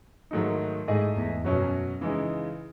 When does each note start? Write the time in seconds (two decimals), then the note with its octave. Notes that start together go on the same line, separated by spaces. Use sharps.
0.31 G#2 D#3 F#3 A3 D#4
0.88 G#2 A3 E4 G#4 D#5
1.16 E2
1.44 F#2 B2 F#3 C#4 F#4
2.01 C#3 E3 G#3 D#4